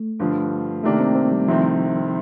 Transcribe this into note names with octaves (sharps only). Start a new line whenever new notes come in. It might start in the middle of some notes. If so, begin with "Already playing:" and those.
Already playing: A3
G2 D3 F3
C3 D#3 A3 A#3 D4 G4
C4
C4
G3
C2 C3 D#3 F3 A3 C4